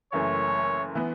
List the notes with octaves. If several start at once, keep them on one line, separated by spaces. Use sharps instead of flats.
F#1 F#2 E3 A3 C#5
E3 B3